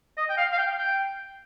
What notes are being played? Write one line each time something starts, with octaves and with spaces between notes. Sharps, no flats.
D#5
G5
F5
F5
G5
G5